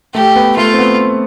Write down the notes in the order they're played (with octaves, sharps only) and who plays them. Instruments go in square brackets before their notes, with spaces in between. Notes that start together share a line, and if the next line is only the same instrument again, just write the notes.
[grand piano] A3 [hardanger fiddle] G4
[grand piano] B3
[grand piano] A3 [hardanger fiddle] F4
[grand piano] C4
B3